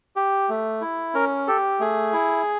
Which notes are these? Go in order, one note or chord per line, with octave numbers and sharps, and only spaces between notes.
G4
A3
E4
C#4 A#4
G4 A4
A3 G#4
E4